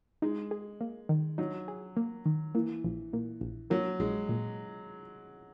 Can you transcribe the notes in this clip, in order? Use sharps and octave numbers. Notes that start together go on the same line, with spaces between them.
G#3 D#4
G#4
A#3
D#3
F#3 D#4
G#4
A#3
D#3
E3 A#3
A#1
A#2
A#1
F#3 A#3
A#1 G#3
A#2